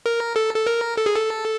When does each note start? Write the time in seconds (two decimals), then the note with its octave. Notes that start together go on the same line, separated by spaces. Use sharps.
0.06 A#4
0.36 A4
0.55 A4
0.67 A#4
0.97 A4
1.06 G#4
1.16 A4